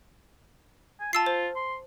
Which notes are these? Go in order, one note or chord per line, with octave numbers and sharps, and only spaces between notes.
G#5
F4 A5 E6 C7
C5
C6